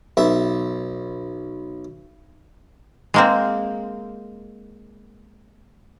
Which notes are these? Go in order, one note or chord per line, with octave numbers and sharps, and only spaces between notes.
B1 E5
G#3 A#3 C4